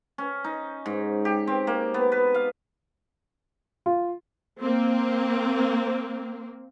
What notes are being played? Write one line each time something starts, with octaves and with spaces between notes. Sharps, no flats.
C#4
D#4
G#2
G4
C4
A#3
B3
B4
F5
F4
A#3 C4